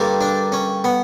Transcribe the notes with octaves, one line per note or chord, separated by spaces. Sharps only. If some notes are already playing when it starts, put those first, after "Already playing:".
Already playing: G2 D3 G3 A#3
D4
C#4
B3